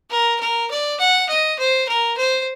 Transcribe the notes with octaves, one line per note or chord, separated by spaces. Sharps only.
A#4
A#4
D5
F#5
D#5
C5
A#4
C5